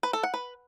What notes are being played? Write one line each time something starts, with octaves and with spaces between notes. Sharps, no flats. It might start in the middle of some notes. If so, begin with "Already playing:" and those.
B4
A4
F#5
B4